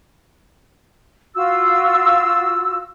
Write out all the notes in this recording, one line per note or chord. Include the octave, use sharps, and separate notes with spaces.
F4 F#4 E6